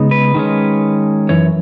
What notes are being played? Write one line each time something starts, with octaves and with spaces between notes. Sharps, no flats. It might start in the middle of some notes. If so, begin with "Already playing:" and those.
Already playing: C#3 G#3 B3 D#4
B4
D#3 G#3 C#4
F#2 E3 C#5